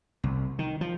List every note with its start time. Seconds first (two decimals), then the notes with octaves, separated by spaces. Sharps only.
0.24 C2
0.59 D#3
0.81 F3